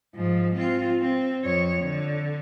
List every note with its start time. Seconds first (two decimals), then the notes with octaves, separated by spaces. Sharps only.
0.15 G#2 F3
0.55 C4 F4
1.02 C4
1.44 F2 C#5
1.81 D3